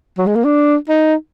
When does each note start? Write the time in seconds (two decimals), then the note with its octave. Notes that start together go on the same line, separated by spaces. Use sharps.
0.18 F#3
0.27 G#3
0.35 A#3
0.44 D4
0.89 D#4